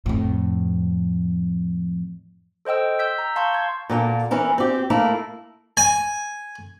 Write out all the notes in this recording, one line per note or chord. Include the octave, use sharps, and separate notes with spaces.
F2 A2
A4 C5 D#5 G5 E6
E6 G6 B6
A#5
F5 A5 C6 C#6 G6
C6 G#6
A#2 D3 A#3
E3 C#4 E4 A#4
C4 G4
A3 A#3 E4 A#4
G#5